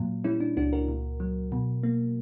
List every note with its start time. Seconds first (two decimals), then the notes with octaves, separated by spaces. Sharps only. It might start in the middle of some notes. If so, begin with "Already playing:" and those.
Already playing: A#2 F#3
0.24 G3 C#4 E4
0.40 D4
0.57 C#2 D4 F#4
0.73 F#4 A#4
0.89 A#2
1.20 F#3
1.52 B2
1.83 A#3